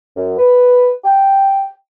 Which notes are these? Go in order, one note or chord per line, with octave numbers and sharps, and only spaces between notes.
F#2
B4
G5